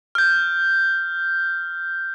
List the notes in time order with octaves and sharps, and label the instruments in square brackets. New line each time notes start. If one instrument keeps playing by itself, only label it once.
[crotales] F6 G6